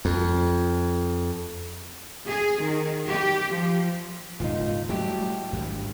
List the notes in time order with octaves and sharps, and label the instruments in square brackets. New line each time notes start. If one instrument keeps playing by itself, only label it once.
[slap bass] F2
[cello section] G#4
D#3
G4
F3
[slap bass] D#1 G#2 C#3 [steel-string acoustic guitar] D#4 F4
[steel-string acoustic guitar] A2 F#4 G4 [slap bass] F#3 G3 A3
[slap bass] G#1 G2